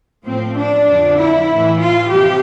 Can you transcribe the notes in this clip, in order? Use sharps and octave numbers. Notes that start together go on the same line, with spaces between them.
A2 F3 C4
D4
F2 D3 F3
E4
A2 E3
F4
C3 F3 G4